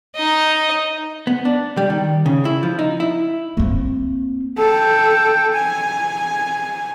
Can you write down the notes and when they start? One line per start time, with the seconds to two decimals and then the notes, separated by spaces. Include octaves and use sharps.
0.16 D#4 D#5
1.27 B3
1.45 D4
1.77 G3
1.90 D#3
2.26 C#3
2.45 E4
2.63 F3
2.79 D#4
3.00 E4
3.57 A#3 C4
4.58 A4 G5
5.53 G#5